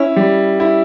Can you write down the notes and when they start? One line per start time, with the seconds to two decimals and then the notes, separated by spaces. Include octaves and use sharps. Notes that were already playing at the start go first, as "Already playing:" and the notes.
Already playing: C#4 E4
0.16 G3
0.60 E4